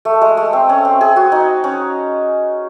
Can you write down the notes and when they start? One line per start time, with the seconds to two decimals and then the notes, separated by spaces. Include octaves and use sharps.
0.05 A3
0.21 G#3
0.37 A3
0.53 C4
0.69 C#4
0.85 C4
1.01 G#4
1.16 F#4
1.32 D#4
1.64 C#4